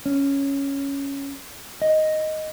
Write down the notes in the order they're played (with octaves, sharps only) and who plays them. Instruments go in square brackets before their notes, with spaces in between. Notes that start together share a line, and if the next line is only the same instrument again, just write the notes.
[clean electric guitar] C#4
D#5